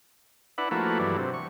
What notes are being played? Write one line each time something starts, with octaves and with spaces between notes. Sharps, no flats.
D4 E4 B4 F#5
F3 A3 A#3 E4 F#4 B4
G2 E3 F#3 D4
C3
C#6